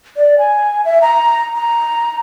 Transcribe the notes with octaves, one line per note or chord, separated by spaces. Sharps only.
D5
G#5
E5
A#5
A#5